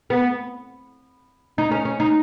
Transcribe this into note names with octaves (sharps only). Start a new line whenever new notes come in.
B3
D#4
C#4
C#4
D#4